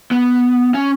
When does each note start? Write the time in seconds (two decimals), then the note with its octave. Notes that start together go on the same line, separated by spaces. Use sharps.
0.11 B3
0.74 C#4